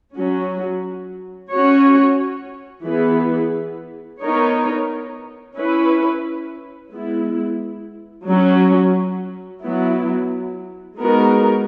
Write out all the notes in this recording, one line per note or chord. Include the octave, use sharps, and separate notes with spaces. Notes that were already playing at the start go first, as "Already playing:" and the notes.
F#3 C#4 F#4
C#4 F#4 C#5
E3 B3 E4 G#4 B4
B3 D#4 A#4 C#5
C#4 E4 B4
G#3 B3 E4
F#3 C#4 F#4
F#3 B3 E4
G#3 B3 D#4 F#4 A#4